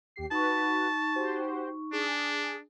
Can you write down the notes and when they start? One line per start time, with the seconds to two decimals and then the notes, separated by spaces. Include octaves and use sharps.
0.16 D#2 G4 C7
0.31 D#4 F#4 B4 A5 C#6
1.16 F#4 G4 C5
1.93 D4 G#4